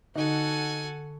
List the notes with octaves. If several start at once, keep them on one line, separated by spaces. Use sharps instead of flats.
D3 D#4 F#4 A4 F#5 G#5